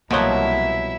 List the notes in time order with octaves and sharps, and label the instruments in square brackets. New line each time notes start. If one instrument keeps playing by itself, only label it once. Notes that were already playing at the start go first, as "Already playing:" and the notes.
[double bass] C2 [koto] B2 F3 F#3 [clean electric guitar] A#3 C#5 [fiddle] E4 E5